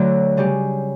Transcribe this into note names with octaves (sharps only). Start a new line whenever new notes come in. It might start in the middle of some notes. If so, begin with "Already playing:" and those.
Already playing: D2 D3 F#3 F#4
C#3 G3 C#4 G4